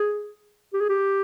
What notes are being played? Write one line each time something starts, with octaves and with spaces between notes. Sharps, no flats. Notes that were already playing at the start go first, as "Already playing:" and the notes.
Already playing: G#4
G4
G#4
G4